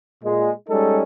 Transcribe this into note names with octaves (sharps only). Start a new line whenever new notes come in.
A#2 G#3
G3 G#3 C#4 D#4 A4